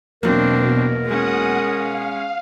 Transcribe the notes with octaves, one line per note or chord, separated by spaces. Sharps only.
E2 B2 F#3 A#3 C4 D4 A#4
G#3 C#4 F#5 D#6
F5